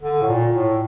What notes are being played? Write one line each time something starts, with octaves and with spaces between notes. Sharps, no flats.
D3
A2
A#2
A2